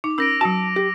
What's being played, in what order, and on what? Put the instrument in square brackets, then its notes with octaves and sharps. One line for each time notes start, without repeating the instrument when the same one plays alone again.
[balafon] D#4 [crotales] D6
[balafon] C#4 A#4 [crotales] E6 A#6 D7
[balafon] F#3 F#4 [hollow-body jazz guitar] A5
[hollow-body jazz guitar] G4